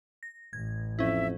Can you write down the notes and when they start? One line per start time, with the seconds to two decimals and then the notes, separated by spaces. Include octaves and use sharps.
0.23 A#6
0.53 A1 G#6
0.99 F2 C#4 E4 E5